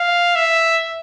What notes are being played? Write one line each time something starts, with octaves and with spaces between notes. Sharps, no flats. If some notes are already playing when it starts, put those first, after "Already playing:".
Already playing: F5
E5